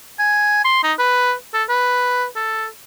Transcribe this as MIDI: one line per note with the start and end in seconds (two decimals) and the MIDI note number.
0.19 0.60 80
0.65 0.79 84
0.83 0.93 63
0.99 1.34 71
1.54 1.63 69
1.69 2.26 71
2.36 2.66 69